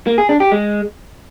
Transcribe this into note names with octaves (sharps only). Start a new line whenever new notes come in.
A#3
G#4
D4
G4
G#3